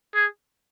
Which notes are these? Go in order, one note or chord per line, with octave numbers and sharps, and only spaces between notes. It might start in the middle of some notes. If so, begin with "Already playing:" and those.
G#4